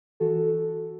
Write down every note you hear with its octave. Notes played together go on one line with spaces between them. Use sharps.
E3 F#4 A4
E3